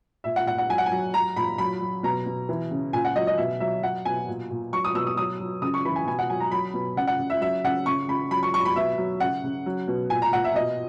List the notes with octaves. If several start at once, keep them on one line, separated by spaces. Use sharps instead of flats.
A#2 E5
F#5
A#2 F#5
F#5
F#3 G#5
F#5
G#5
F#3
F#3 A#5
A#2 B5
F#3 B5
F#3
B2 A#5
B2
E3
C#3
A#2 G#5
F#5
F#3 D#5
D#5
B2 E5
F#3 E5
F#3 F#5
B2 G#5
A#2
A#2
F#3 C#6
D#6
B2 E6
D#6
F#3 D#6
F#3
C#3 D#6
C#6
E3 B5
G#5
B2 G#5
F#5
F#3 G#5
A#5
F#3 B5
B2
C#3 F#5
F#5
C#3
E5
F#3 E5
C#3 F#5
C#3 C#6
C#3 B5
F#3 B5
C#6
F#3 C#6
B5
B2 E5
F#3
C#3 F#5
C#3
F#3
B2
A#2 G#5
A#5
A#2 F#5
E5
B2 D#5